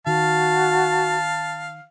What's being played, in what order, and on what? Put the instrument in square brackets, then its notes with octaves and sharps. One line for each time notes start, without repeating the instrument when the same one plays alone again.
[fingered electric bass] D#3 [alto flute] F#4 [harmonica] F5 [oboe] A5